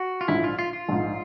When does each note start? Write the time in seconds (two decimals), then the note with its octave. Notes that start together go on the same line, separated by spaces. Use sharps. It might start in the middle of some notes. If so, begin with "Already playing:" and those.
Already playing: F#4
0.21 F4
0.28 A#1 G#2 F3 E4
0.44 F4
0.59 F4
0.73 F4
0.89 A#1 G#2 F3